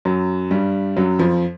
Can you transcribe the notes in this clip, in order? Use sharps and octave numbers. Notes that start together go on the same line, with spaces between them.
F#2 F#3
G2 G3
F#2 F#3
F2 F3